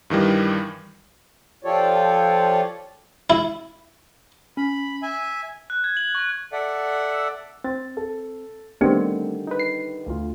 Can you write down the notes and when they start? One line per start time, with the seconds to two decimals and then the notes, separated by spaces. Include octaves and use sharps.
0.10 G2 D#3 E3 G3
1.64 F3 F4 G4 A4 C#5 D5
3.30 E4
4.57 C#4 B5
5.02 E5 G#5
5.70 F#6
5.84 G#6
5.97 F#7
6.15 C#6
6.52 A4 D5 E5 F#5
7.64 C4 A6
7.97 A4
8.81 D3 D#3 G3 A3 B3 C4 D4 G4
9.47 D#4 B4
9.59 C7
10.06 D2 F4